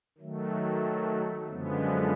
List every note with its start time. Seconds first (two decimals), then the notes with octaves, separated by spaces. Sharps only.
0.18 D#3 F#3 A3
1.48 F#2 D3 F3 G#3 B3